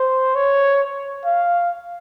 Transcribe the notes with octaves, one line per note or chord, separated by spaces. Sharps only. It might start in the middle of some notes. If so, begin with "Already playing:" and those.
Already playing: C5
C#5
F5